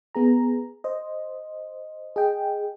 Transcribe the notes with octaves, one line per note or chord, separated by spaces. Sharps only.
B3 G#4 A#5
C5 D#5
G#4 D#5 G5